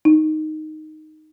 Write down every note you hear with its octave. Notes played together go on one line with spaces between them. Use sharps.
D#4